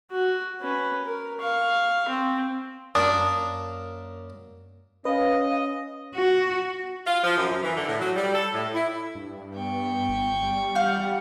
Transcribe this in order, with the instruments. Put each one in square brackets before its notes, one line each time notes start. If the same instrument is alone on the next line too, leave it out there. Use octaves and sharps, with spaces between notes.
[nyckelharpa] F#4
C#4 B4
A#4
F5 C#6
C4
[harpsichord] F#2 A#3 A#4 [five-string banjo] D4 [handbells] D#6
[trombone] C#4 [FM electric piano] B4 [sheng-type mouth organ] D#5 [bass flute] F5
[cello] F#4
[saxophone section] F4
F3
F#2
F#2
E3
D3
A2
F#3
G3
A4
A2
E4
[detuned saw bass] G2
[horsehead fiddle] B3 [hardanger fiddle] G5 C#6
[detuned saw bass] G1
G3
[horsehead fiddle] G4 F#5 [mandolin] F5 F6 G6